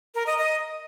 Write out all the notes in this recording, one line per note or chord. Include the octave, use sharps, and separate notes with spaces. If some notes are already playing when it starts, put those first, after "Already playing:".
A#4
D#5
D#5